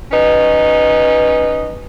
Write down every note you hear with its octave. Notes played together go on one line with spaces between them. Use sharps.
C#4 D#4 B4